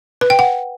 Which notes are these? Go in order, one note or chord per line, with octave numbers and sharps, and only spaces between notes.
B4
G5
F#5